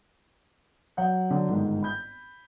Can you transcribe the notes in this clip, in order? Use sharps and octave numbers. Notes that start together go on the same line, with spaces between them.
F#3 F#5 G6
D3 F#3
G1 G#2 D#3
B5 G6